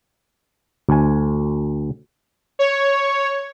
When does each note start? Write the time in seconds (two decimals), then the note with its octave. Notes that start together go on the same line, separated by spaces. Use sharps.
0.89 D2 G#5
2.59 C#5